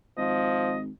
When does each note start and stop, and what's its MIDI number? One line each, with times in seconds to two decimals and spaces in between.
0.18 0.90 32
0.18 0.75 53
0.18 0.79 75